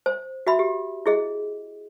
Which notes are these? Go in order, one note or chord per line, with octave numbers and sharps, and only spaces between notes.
C5
F#4 E5 B5
G4
E4 G#4 D#5